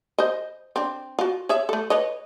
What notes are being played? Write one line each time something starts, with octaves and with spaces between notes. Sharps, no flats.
C5 D#5
C4 D4
F4 F#4
G#4 C#5 E5
A3 A4
B4 C#5 D#5